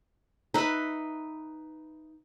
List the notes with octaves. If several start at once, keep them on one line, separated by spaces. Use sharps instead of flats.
D#4 B4 E5